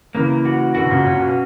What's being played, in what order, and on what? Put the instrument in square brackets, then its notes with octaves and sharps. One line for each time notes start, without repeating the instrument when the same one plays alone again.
[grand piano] C#3 E3 [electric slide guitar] A#3
[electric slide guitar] F#4
[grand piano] B2 D3 [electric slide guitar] F#4
[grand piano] A#2 C#3
[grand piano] A#2 [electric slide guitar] C#4
[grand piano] B2